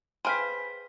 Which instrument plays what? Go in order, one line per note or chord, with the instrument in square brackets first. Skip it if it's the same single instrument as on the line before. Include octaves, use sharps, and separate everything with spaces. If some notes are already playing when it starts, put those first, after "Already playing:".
[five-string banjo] G#4 F5 [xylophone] B4 G5 G#5 [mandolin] C5 [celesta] B5 B6